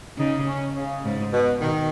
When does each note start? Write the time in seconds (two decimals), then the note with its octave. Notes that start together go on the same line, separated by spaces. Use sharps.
0.18 C#3 D#4
0.47 C#4
0.75 C#3
1.04 G#2
1.32 B2
1.60 B2 D#3